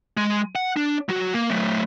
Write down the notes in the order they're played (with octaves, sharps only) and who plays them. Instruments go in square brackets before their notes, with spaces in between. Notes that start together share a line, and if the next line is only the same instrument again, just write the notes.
[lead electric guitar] G#3
F#5
D4
F#3 F#4
A#3
F#3 A3